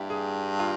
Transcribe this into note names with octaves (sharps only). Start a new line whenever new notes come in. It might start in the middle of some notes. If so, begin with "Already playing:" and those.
Already playing: G2 E4 G4
G#4
F4